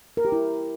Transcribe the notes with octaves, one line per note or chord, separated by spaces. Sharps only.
A#4
G4
E4